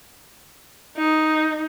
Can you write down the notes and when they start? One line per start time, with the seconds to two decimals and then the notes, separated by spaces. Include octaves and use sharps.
0.97 D#4